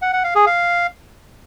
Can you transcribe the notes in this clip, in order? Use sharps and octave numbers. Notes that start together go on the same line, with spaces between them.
F#5
F#5
F5
G#4
F5